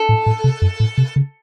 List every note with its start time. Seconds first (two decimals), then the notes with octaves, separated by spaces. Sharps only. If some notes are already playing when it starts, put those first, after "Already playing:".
Already playing: A4
0.09 A2
0.26 A2
0.44 C3
0.62 F#2
0.80 A2
0.98 C3
1.16 C#3